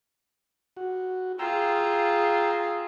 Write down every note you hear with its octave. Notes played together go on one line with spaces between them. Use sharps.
F#4
F4 G#4 G5 A#5 E6